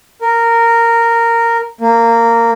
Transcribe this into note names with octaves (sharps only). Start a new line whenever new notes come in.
A#4
A#3